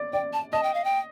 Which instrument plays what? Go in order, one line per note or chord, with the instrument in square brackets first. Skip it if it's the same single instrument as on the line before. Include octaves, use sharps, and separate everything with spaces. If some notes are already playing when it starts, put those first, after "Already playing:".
Already playing: [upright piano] D5
[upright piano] D5 [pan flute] G5
[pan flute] A5
[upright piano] D#5 [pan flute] A5
[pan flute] G5
F5
G5